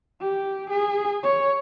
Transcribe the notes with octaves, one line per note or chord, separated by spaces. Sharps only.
G4
G#4
C#5